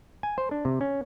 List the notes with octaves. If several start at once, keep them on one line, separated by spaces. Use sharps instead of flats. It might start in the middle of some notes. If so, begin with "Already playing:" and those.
G#5
C5
D4
C3
C#4